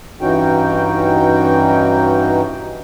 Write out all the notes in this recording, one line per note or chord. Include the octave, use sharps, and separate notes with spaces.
G2 E3 C#4 D#4 F#4 G5